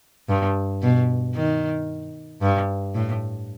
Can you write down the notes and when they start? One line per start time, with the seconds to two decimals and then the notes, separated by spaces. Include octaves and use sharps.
0.29 G2
0.82 B2
1.35 D#3
2.42 G2
2.95 A2